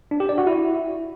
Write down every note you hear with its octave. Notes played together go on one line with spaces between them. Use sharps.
D4
G4
D5
F#4
E4